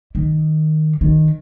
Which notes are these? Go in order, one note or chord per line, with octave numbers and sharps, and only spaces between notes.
D#3
D#3